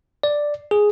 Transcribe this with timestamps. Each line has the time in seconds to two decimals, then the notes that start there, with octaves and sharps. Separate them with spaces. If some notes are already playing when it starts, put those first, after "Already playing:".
0.23 D5
0.71 G#4